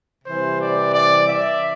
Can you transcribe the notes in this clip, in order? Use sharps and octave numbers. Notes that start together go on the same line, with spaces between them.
C3 E3 G3 C5
D5
D5
E5